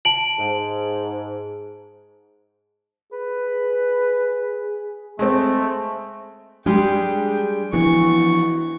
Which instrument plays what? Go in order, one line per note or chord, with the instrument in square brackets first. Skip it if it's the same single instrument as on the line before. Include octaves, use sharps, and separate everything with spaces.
[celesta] A5 D7 F#7
[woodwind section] G#2
[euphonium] G#4 [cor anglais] B4
[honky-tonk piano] G#3 C4 [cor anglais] A3
[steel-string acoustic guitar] G3 G#3 G#4 [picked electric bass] D4 [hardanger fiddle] G5
[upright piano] E3 [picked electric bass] F3 B3 D4 [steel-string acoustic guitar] F#4 [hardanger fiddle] C#6